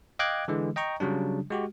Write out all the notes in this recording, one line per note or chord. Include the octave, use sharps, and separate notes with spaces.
D#5 F5 G5 D6 F#6 G#6
D3 E3 G#3
D#5 G5 A#5 C#6
C#3 F#3 G3 D4
G#3 F#4 G4